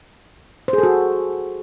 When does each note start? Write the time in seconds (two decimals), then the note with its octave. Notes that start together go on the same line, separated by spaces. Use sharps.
0.68 C5
0.73 G#4
0.78 A4
0.83 F#4